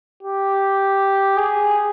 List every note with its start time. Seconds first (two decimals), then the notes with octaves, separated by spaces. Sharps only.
0.23 G4
1.37 G#4